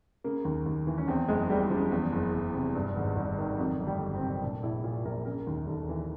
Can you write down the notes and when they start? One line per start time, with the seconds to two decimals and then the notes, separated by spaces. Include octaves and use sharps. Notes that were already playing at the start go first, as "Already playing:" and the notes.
0.24 C#3 A#3
0.45 D#2
0.66 D#2
0.87 E3
0.98 C#4
1.08 E2 C4
1.28 F#1 G#3
1.50 E3 G3
1.70 C#3 F3
1.92 E2
2.12 F#1
2.34 F#1
2.54 C3
2.75 G2
2.97 G#1
3.16 G#1
3.38 D#3
3.58 F2 F#3
3.80 G1
3.87 G3
4.00 G1
4.15 C4
4.21 C3
4.42 A#2 D4
4.63 A#1 E4
4.84 A#2 F4
5.05 A#1 A#4
5.25 C#3 A#4
5.47 D#2
5.67 D#2 A4
5.89 E3